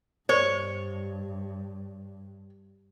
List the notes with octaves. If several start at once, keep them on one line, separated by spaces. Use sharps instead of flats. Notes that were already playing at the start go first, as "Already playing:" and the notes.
G2 C5 C#5 C#6